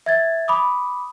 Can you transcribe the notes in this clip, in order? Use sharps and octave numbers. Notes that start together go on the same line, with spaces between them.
E5 G#6 A6
B5 D6 D#6